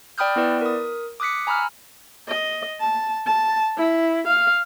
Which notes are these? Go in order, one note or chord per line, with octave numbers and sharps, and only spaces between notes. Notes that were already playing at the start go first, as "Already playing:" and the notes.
D5 G5 B5 D#6 F6 G6
B3 E4 B4 D5
A#4 D#6
D6 D#6 F#6 B6 C#7
G#5 A#5 B5 E6 F6
D#5
A5
A5
E4
F5